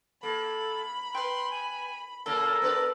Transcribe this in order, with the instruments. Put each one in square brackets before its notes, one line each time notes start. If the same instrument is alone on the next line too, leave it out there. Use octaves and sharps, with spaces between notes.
[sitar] A#3 [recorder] A4 [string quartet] B5
[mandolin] B4 G5 [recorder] C6
[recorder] G#5
[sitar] A#2 C#3 A#3 [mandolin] A4 [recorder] A#4
[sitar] B3 D4 B4